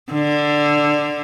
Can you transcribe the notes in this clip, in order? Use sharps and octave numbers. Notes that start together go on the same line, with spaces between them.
D3